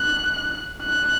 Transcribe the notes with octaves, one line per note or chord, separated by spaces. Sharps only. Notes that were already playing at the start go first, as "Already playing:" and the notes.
Already playing: F#6
F#6